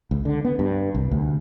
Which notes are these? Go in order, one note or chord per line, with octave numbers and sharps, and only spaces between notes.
C#2
D3
B3
G2
C2
D2